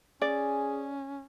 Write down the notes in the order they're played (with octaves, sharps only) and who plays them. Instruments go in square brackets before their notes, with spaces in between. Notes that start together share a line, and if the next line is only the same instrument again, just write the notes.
[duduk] C#4 [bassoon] G#4 [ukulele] D5